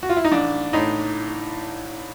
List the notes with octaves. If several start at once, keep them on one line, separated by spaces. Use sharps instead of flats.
F#4
F4
E4
D#4
A1 D4
A2 D#4